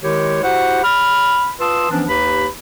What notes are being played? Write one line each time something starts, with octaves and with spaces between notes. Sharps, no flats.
D#3 G#3 E4 G4 C#5
E4 F#4 G4 C5 F#5
B5 F6
F4 B4 A5 C6 D#6 E6
E3 F3 B3 C#4 D4
D#2 D#4 G4 B4 B5